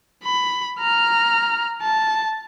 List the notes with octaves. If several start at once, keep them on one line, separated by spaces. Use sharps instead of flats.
B5
A#5 F6
A5